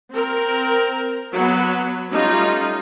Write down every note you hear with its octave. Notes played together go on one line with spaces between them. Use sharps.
C4 A#4
F#3 B3
G3 A3 C#4 D#4 F4